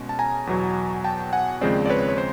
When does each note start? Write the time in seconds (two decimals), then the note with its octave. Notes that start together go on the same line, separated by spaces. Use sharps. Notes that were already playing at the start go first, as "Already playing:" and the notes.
Already playing: B2 G#3 C#4
0.09 A5
0.19 G#5 A#5
0.47 E2 B2 F#3
1.04 G5 A5
1.33 F#5 G#5
1.61 D#2 C#3 F3 G#3 C4 C5 D5
1.86 D5
1.90 B4 C#5
2.09 C#5
2.18 C5